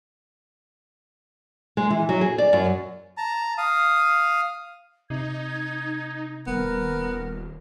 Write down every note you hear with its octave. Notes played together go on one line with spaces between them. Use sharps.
G#3
E3
F#3
G#4
D5
F#2
A5 A#5
F5 D#6
C3 D#4 G#6
D#1 B3 A#4